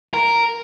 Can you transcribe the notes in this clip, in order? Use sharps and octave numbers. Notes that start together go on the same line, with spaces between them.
A#4